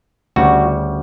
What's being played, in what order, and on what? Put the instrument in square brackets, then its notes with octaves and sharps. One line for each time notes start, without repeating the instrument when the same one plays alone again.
[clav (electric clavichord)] D2 C#3 G3 F#4